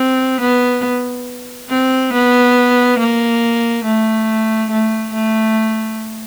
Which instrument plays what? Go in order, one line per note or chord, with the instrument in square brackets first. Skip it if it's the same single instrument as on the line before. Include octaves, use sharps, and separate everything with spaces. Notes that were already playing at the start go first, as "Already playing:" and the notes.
Already playing: [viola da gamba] C4
B3
C4
B3
A#3
A3
A3
A3